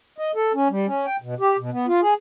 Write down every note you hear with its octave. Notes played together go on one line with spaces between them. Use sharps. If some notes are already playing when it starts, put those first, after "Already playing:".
D#5
A4
C#4
G3
C#4
G5
B2
G4
B2
B3
F4
G#4